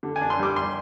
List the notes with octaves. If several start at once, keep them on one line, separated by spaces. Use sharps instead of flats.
D3
G#5
D4
C6
G3 D6
C6